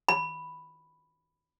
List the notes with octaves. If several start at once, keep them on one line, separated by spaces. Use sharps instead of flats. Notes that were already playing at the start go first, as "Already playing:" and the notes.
B5